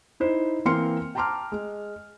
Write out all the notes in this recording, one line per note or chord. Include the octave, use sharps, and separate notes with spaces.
D#4 E4 C5
E3 A#3 C4 C6 F6 C#7
G5 A5 A#5 C6 D6 F6
G#3